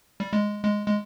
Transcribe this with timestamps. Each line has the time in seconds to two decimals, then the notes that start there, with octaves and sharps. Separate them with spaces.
0.20 G3
0.33 G#3
0.64 G#3
0.87 G#3